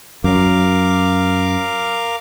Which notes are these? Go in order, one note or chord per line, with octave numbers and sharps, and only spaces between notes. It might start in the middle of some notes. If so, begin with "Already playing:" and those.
F#2 F#3 A#4 F5 D6